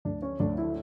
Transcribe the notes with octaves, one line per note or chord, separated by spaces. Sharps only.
D2 D4
C#4
D2 D4
E4